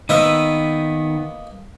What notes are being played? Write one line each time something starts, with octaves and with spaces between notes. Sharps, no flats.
D#3 A#3 B3 B4 D#5 E6